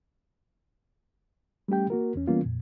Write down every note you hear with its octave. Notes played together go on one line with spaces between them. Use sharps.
G3 A3 C#4 G4 G5
A#3 F#4 A#4
E2 C#4
E3 G3 A#3 B3 C#4 F4
F2 A#2